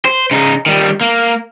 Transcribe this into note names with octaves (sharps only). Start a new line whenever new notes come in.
C5
C#3 D#4
D#3 G3
A#3